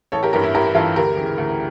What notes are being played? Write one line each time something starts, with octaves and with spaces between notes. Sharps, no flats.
A1 A4 C#5
G4 A#4
G2 E3 G4 A#4
E4
A1 G4 A#4
G2 E3 F4 A4
D2 G4 A#4
C#3 E3
D2